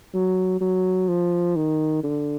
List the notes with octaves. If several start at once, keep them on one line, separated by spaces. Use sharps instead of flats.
F#3
F#3
F3
D#3
D3